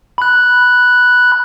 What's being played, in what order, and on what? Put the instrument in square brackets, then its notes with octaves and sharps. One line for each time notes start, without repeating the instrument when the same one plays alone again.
[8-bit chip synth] B5 F#6